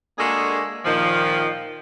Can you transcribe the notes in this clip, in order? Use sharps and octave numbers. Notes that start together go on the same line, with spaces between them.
G#3 A#3 D4 F#4 G#4 A4
A#2 D#3 F3